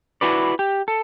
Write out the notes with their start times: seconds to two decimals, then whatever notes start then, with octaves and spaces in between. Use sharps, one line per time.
0.21 E4 F#4 B4 D5
0.59 G4
0.88 A4